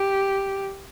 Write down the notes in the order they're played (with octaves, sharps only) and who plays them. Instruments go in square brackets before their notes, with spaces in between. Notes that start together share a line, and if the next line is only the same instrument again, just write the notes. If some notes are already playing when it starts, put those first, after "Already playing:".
Already playing: [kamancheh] G4